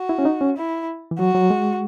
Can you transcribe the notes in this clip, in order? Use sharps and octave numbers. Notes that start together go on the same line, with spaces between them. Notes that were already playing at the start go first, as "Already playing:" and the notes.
Already playing: F#4
E4
C#4
D#4
C#4
E4
E3
F#3 F#4
F#3
G#3